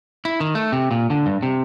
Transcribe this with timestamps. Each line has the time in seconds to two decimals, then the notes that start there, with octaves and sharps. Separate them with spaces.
0.25 E4
0.40 D#3
0.55 A3
0.72 C3
0.91 A#2
1.10 D3
1.26 G2
1.43 C3